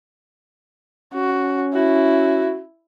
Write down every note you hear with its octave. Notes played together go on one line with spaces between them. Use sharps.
C#4 F#4
E4 F#4